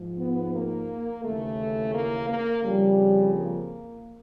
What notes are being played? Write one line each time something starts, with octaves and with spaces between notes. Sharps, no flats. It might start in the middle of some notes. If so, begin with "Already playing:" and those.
Already playing: G#2 F3
B3
A#3
D#2 C#3 E3 A3
A#3
A#3
F2 C#3 F3 G3
A#3